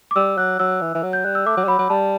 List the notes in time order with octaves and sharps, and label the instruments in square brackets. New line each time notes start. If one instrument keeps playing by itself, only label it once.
[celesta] D6
[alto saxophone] G3 [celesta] E6
[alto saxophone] F#3 [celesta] F#6
[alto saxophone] F#3 [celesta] E6
[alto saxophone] E3
E3
F#3
[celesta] G6
[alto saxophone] G3 [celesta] F#6
[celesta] E6
[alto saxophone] A3 [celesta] D6
[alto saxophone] F#3
G3
[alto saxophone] F#3 [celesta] B5
[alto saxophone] F#3
[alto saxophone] G3 [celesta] A5